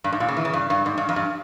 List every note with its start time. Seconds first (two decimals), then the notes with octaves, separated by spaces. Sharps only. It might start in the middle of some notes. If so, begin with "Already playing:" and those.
0.04 G2
0.12 G#2
0.20 A#2
0.28 C#3
0.37 E3
0.45 C#3
0.54 G2
0.70 G2
0.86 G#2
0.98 G2
1.09 F2
1.16 G2